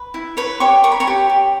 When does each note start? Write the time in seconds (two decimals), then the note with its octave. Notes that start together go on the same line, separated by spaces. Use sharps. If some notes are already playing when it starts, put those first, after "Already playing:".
Already playing: B4
0.14 E4
0.37 B4 C#5 B5
0.60 G4 C#5 C#6
0.84 A#4 C#6
0.92 B5
1.00 C#5 C#6
1.07 G4
1.30 G4